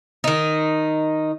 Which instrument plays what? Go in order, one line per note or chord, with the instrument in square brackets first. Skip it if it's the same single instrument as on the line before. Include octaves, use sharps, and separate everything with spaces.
[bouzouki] D#3 D#4